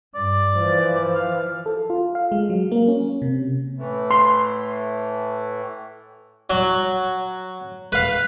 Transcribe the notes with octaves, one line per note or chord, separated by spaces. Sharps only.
G2 D5
E3 F3
F5
A4
F4
F5
G#3
F#3
A#3
C#4
C3
A2 E3 A3
C6
F#3
B4 F5